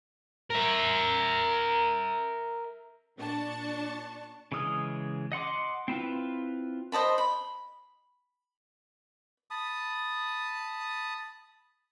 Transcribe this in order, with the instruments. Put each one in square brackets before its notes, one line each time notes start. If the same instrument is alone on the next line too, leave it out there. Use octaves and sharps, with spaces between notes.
[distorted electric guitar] A#4 E5
[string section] A#2 D4 A5 C#6
[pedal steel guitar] C#3 E3 G#3 D#6 F6
D#5 F#5 C6 D6
C4 E4 F4 B4
[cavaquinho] C5 D#5 A5 B5
B5
[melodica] A5 B5 D#6